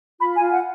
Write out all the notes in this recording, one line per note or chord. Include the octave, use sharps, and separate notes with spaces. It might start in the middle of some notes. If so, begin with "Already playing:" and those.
F4 B5
G#5
F4
F#5